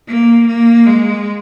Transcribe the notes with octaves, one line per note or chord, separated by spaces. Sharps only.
A#3
A#3
G#3